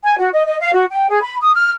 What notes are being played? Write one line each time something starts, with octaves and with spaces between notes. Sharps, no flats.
G#5
F#4
D#5
D#5
F5
F#4
G5
G#4
B5
D#6
F6